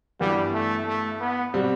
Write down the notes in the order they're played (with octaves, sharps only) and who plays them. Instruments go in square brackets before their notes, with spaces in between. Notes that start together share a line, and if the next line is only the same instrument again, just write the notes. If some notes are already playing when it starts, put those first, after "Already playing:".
[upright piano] G2 E3 B3 F#4 [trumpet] G3
[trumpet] A3
A3
B3
[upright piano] B2 G3 C4 F#4